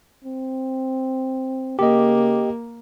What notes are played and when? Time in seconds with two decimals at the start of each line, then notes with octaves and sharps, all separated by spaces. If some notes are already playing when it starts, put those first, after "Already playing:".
0.24 C4
1.79 C#3 A#3 G4 D#5